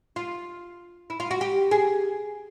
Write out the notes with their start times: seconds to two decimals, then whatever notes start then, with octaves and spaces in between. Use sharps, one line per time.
0.16 F4
1.10 E4
1.20 F4
1.31 F#4
1.41 G4
1.71 G#4